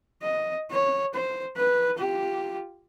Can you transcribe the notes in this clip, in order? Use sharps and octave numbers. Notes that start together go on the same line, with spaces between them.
D#5
C#5
C5
B4
F4 G4